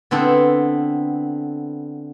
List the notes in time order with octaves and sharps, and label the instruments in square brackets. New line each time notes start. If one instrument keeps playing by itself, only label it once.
[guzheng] D3 B3 C4 D4 E4